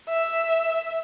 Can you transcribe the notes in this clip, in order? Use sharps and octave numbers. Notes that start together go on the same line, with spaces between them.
E5